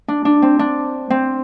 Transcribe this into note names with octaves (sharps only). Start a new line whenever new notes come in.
D4
D4
C4
D4
C4